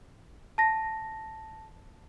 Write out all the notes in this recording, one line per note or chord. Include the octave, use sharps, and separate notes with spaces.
A5 A#6